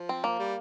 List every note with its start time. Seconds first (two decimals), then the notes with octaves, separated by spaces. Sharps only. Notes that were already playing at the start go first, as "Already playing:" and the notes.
Already playing: F3
0.09 C4
0.24 A#3
0.39 G3